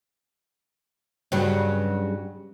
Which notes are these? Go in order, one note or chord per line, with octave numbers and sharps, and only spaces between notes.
G2 C#3 F#3